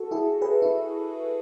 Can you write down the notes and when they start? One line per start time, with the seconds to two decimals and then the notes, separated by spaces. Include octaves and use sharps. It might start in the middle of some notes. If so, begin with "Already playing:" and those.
Already playing: F#4 A4
0.11 E4 G#4
0.42 G#4 B4
0.62 E4